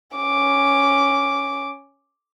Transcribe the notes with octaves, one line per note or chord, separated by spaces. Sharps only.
C#4 D6